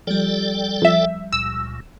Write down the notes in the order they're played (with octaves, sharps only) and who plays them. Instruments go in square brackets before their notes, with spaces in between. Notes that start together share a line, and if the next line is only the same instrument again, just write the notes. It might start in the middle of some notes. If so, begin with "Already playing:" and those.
[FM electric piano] F3 G3 [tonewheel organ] A4 D5 G5
[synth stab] F2 E5
[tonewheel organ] C#2 A#2 [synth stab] E6